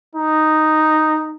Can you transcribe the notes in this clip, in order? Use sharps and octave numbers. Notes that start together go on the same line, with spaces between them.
D#4